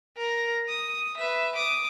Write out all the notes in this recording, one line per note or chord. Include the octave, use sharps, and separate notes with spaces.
A#4 A#6
D#6
B4 E5
D6 D#6